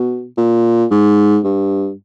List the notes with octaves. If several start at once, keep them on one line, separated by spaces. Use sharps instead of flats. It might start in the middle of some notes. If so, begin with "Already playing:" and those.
Already playing: B2
A#2
G#2
G2